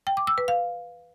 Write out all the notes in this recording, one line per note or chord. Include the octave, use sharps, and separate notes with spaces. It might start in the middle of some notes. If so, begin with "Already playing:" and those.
G5
D6
E6
B4
F5